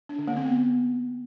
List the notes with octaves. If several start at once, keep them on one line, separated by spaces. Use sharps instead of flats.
D4
D3
A#3
C4
B3